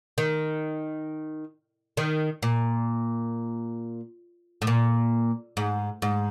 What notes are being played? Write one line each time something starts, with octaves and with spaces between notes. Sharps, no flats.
D#3
D#3
A#2
A2
A#2
G#2
G#2